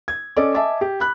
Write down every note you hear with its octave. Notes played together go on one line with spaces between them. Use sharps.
G#6
C#4 A4 D5 D#5 D6
D#5 E5 G#5 A5 D6
G4
B5 F#6